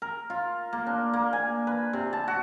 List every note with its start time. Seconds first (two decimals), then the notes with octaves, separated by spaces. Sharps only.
0.02 A#4
0.30 F4
0.73 A#3
0.86 D4
1.13 A#3
1.33 G#5
1.67 B4
1.93 C3
2.13 A5
2.28 F#4